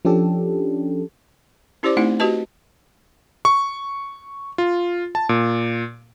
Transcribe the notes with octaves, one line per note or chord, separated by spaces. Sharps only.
F3 C#4 D4 G4 A4
C#4 E4 G4 C5 D5 D6
A3 C4 D#4 E4 F#5
F#4 G4 B4 D#5 A5
C#6
F4
A5
A#2